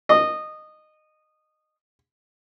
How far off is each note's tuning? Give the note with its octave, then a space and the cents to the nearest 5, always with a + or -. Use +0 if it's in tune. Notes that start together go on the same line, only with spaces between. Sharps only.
D#5 -15